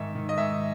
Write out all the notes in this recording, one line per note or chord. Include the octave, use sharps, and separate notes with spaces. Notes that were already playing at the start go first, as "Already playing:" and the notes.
Already playing: G#2 D#3 E5
D#3
D#5
G#2 E5